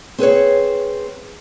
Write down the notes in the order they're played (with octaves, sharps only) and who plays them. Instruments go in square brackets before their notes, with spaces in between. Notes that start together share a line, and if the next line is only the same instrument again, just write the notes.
[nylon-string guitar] C4 G#4 B4 C#5